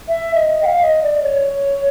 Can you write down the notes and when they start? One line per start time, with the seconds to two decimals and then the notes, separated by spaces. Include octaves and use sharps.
0.08 E5
0.35 D#5
0.62 G5
0.66 F5
0.82 D#5
1.03 D5
1.23 C#5